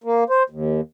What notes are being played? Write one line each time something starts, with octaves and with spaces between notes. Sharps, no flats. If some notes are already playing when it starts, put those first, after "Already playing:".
A#3
C5
D#2